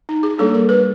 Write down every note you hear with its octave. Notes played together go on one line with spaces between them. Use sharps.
D#4
G#4
G3 A#3 D4 A4
A#4
B4